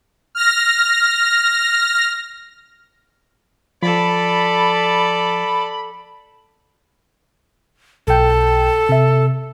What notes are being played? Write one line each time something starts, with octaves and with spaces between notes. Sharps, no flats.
F6 A#6
F3 A4 D5 B5
B1 A4 G5
C3 E5